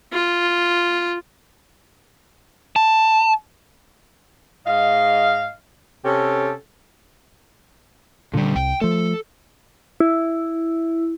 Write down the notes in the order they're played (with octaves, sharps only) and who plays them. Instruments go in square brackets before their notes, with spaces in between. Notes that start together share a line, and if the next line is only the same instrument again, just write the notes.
[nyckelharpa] F4
[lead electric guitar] A5
[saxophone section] G#2 D#5 F5
C3 C#4 G4 A4
[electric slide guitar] A#2 G3 [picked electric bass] D3
[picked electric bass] C2 [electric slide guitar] G5
[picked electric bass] F3 A3 [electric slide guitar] A4
[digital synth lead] E4